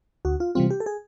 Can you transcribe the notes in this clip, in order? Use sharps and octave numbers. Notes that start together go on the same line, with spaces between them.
D2 F#4
F4
C3 E3 G3 C4 F4
G4
A4
G#4